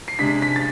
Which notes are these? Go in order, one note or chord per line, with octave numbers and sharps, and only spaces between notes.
C7
C3 G#3 D4 B6
B6
A6